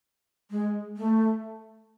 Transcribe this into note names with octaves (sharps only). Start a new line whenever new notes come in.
G#3
A3